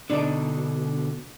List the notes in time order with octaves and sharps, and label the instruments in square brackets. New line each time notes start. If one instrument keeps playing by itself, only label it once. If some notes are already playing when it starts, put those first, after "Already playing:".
[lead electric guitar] B2 D3 [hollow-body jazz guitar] D4 D#4 D5